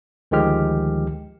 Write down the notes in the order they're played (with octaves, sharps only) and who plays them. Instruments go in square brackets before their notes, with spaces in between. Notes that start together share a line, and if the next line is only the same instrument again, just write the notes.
[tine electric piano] D2 D#3 F3 G#3 G4 F6